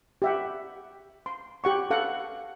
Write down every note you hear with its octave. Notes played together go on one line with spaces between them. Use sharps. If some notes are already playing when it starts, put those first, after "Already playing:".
G4 E5 F#5
C6
G4 F#5 C#6
A4 F5 F#5